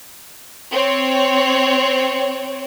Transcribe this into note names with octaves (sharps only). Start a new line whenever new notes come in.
C4 C#5